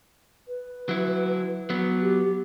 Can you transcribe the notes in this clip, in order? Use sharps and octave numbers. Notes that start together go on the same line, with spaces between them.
B4
F#3 E4
F#3 B3
G4